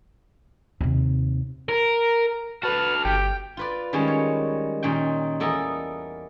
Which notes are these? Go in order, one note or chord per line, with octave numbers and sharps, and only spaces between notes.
D#2 C3
A#4
F#4 A4 B4 A5 F6
G1 G4 G5
F4 B4 D5
D#3 G3 G#3 C#4
C#5
A#2 D#3 C#4 G5
E2 A4 A#4 D5 D#5